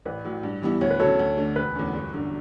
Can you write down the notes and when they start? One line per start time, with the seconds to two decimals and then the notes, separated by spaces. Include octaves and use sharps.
0.06 A1 B4 D5
0.24 A2 F#3
0.43 G2
0.62 E3 G3 B3 E4
0.81 D2 C#5
0.90 B4
1.00 F#3 A4 C#5
1.05 C#3
1.19 D2
1.37 D3 A3 D4
1.56 E1 B4
1.75 E2 D3 A3 C#4
1.94 G1
2.13 F#2 D3